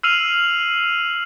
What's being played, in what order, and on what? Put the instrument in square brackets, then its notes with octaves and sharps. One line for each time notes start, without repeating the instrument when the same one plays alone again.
[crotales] E6 F6 C7 D#7 F7 F#7